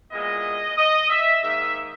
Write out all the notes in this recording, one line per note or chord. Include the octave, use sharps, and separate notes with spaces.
A#2 G#3 B3 E4 D#5
D#5
E5
G#2 D#3 A#3 D#4 E5